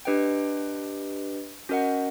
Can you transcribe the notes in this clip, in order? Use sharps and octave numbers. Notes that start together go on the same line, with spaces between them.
D4 G4 B4 D#5 G5
C#4 F#4 A#4 D#5 F#5